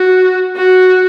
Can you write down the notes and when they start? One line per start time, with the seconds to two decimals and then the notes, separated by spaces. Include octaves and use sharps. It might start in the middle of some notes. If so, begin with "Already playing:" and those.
Already playing: F#4
0.57 F#4